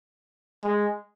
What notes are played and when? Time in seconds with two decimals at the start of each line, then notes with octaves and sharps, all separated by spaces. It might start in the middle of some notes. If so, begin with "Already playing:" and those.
0.64 G#3